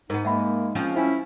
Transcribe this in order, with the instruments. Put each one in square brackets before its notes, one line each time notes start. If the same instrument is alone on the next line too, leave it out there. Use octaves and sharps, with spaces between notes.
[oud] G#2 B3 [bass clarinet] D#4 [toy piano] A#4
[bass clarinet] G#3 [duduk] A#3 [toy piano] E5 F#5 B5
[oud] F3 G#3 C4 [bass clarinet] C#4
[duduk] C#4 [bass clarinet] E4 [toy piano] C5 F5 G#5